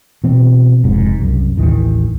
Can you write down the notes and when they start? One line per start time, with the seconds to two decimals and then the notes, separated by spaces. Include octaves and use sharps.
0.24 B2 E3 C4
0.84 F1 G#2
1.20 C2 F#2
1.57 A1 D#2 D#3 E3